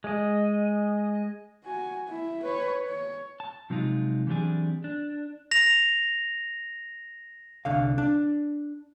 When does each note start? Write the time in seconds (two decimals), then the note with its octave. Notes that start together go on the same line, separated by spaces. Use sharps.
0.04 G#3 D#5
1.64 F#4 G#5
2.09 E4
2.43 B4 C#5
2.87 C#5
3.40 A5
3.70 C3 F3 F#3 G#3 D#4 F4
4.27 E3 F#3 G3 C4 D4 G#4
4.84 D4
5.51 A#6 F7
7.65 C2 D3 F5
7.98 D4